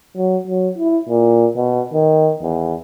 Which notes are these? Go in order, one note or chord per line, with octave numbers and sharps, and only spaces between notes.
F#3
F#3
E4
A#2
B2
D#3
E2